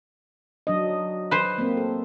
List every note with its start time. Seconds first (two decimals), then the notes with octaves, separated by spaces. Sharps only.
0.67 F#3 D4 D#5
1.31 B4 C5
1.58 A#3 C4
1.77 A4